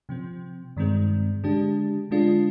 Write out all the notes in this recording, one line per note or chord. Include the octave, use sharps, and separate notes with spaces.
C3 F3 C4
G2 D#3 G#3 C4
D3 G#3 D4 G4
D3 G#3 D4 F4